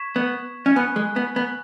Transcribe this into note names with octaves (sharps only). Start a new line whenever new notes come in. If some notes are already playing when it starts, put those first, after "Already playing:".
Already playing: C#6 G#6 B6 E7
B3
C#4
B3 G#5 B5 F#6
G#3
B3
B3